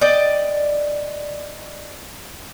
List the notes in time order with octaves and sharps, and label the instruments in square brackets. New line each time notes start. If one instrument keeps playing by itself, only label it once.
[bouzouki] D5 D#5 G5